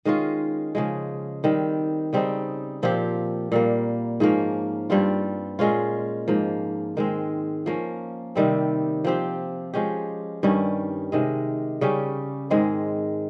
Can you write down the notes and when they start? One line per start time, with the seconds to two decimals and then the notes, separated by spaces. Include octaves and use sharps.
0.05 D#3 G#3 C#4 F4
0.75 C#3 F3 G#3
1.44 D#3 G3 C4
2.13 C#3 G3 C4 D#4
2.83 A#2 F3 C4 G4
3.52 A#2 G3 A#3
4.20 G#2 F3 A#3 C#4
4.90 G2 G3 C4 F4
5.59 A#2 G#3 C#4 F4
6.28 G#2 F3 A#3
6.97 D#3 G#3 C4
7.66 F3 A#3 C#4
8.35 C3 D#3 G3 C4
9.04 F3 C4 G4
9.74 F3 G#3 C#4 G4
10.43 G2 D#3 G3 C#4
11.12 C3 D#3 G#3
11.81 C#3 G3 C#4 G4
12.50 G#2 D#3 G#3 C4